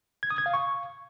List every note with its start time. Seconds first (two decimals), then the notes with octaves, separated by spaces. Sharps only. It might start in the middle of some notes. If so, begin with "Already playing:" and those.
0.23 G#6
0.30 D#6
0.38 G#6
0.46 F5
0.54 C#6